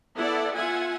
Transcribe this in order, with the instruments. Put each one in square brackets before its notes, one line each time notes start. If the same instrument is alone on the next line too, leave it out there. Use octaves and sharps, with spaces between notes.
[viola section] B3 E4 A4 D5 F#5
F4 E5 F#5 G#5